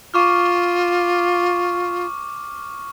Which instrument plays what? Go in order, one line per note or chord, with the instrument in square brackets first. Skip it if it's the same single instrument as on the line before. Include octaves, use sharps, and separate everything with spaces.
[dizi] F4 [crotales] C#6 D6 F6